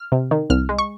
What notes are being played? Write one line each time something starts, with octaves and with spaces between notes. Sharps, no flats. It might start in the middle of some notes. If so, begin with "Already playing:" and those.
Already playing: F6
C3
D#3
C2 F6
G#3
C#6